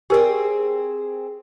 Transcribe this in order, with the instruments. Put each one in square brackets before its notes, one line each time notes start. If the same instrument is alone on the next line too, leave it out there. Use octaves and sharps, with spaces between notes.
[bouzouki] C4 G#4 [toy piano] G4 A#4 D5